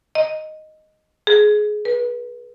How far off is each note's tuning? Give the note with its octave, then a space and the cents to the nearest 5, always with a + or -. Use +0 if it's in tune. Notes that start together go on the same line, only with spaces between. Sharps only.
D#5 +0
G#4 +20
B4 -30